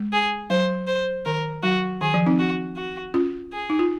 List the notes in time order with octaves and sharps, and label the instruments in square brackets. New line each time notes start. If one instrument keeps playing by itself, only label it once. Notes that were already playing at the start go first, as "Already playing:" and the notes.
Already playing: [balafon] G#3
[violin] G#4
[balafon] F#3 [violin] C5
[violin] C5
[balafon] D#3 [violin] A#4
[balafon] F#3 [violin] F#4
[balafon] D#3 [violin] G#4
[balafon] F3
C4 D#4
[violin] F#4
F#4
[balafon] C#4 F4
[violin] G#4
[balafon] D#4
F4